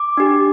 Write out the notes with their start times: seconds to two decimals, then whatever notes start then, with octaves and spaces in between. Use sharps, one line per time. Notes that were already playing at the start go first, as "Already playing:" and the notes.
Already playing: D6
0.17 D4 G4